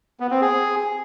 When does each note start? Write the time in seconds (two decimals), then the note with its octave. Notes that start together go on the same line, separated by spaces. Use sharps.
0.20 B3
0.31 C4
0.41 G#4